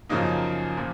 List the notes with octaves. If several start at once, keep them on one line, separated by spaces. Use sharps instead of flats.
F#2 C#3 F3 A#3 D#4
A#2 F3